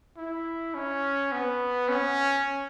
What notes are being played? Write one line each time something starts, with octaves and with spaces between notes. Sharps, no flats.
E4
C#4
B3
C#4